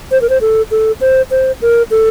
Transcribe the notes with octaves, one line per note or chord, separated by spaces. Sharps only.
C5
A#4
C5
A4
A4
C5
C5
A#4
A4